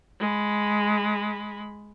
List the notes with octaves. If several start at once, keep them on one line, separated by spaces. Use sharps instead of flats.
G#3 B5